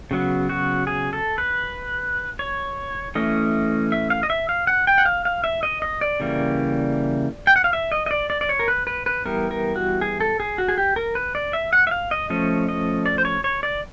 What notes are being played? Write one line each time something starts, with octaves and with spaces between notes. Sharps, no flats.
C#3 F#3 B3
F#4
G#4
A4
B4
C#5
E3 A3 C#4 D#5
E5
F5
D#5
E5
F5
F#5
G5
F#5
F5
F5
E5
D#5
D#5
D5
C#3 E3 G3 A#3
G5
F#5
F5
E5
D#5
D#5
D5
D5
D5
C#5
A#4
B4
B4
B4
E3 G3 B3 A#4
A#4
F#4
G#4
A4
G#4
F#4
G#4
G4
A#4
B4
D5
E5
F#5
E5
F5
D#5
F3 A3 C#4 D#5
D#5
D5
C5
C#5
C#5
D5